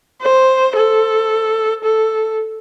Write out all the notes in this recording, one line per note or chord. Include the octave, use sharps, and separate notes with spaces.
C5
A4
A4